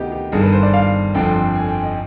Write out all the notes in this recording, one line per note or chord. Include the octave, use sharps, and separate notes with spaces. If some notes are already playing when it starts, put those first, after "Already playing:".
Already playing: D2 C3 D#3 B3 G4 D#5
G4
G1 G2 D#3 G#4
B4
C5
D5
F5
G1 F2 D3 F3 C4 G5
G#5
G5
D#5